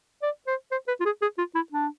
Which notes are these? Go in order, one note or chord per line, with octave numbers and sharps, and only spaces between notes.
D5
C5
C5
B4
F4
G#4
G#4
F4
E4
D4